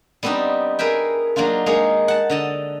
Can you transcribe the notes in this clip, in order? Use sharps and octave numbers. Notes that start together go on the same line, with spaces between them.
G3 B3 C4 D4 D#4
G#4 A#4 B4 E5 G5
F#3 A#3 D4 D#4 F4
G#3 A#3 D#4 G#4 C#5
F#5 A5
D3 D#5 A5